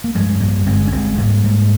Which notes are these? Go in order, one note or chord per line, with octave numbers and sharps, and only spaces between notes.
A#3
G2 F3 G#3
G2 G3 A#3
G1 G#3 C4
C#4
G1 G#3 C4
G#2 G3 A#3
G#2